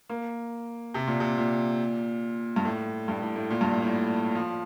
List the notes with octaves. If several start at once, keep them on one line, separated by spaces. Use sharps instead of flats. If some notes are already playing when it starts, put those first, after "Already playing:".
A#3
C3
A#2
C3
A#2
G2
A2
G2
A2
A2
A#2
G2
A2
A2
F3